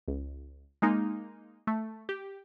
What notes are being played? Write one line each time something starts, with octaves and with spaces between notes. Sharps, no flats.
C#2
G#3 A#3 D#4
A3
G4